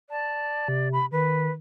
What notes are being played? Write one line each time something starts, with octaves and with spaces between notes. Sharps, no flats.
D5 A5
C3
B5
D#3 B4